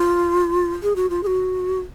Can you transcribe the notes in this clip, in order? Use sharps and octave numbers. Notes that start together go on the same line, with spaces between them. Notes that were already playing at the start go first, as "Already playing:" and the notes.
Already playing: F4
G#4
F#4
F4
G#4
F#4